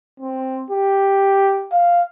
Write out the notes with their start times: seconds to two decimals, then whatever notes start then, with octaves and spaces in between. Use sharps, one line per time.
0.20 C4
0.71 G4
1.72 F5